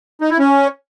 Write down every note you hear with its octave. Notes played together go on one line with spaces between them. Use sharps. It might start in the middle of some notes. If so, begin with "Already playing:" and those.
D#4
E4
C#4